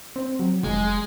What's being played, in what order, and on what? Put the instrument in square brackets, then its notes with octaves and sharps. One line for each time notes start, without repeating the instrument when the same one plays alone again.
[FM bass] C4
F#3
[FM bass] F1 [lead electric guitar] G#3